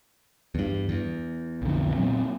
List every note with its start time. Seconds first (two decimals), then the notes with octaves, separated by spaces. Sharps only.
0.55 E2 G2
0.89 E2
1.62 B1 F2 D3
1.96 A#2 F#3 C4